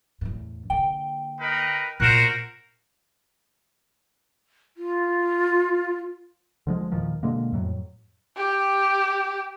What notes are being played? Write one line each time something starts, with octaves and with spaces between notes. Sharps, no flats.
E2 A2
D3 A#3 G5
D#4 A#4 B4
A#2 B3 F#4 A#4 C5 F#6 E7
F4
D3 F3 G#3
E2 A#2 D#3 F3
B2 D3 G#3 A#3
F2 A2 F#3
G4